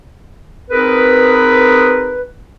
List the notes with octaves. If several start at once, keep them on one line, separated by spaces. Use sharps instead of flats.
C4 D#4 G#4 A#4 B4